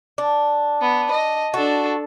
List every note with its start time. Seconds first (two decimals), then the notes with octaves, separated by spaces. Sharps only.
0.18 D4
0.81 B3
1.11 D#5
1.54 D4 F#4 A4